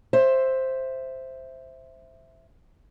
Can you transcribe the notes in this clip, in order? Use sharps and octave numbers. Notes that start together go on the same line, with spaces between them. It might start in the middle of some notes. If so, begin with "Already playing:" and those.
C5 E5